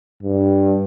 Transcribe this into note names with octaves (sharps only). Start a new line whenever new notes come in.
G2